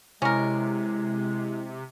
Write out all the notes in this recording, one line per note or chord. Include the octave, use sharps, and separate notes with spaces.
C3 G#3 C#4 E4 A#4